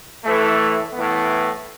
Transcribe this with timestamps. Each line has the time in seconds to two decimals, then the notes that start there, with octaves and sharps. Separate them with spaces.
0.24 A2 E3 A3
0.93 A2 E3 B3